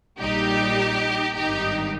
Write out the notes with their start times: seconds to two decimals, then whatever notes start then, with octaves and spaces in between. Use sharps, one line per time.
0.20 A#1 A#2 G3 D#4 G4
1.35 G#1 G2 D#3 D#4 G4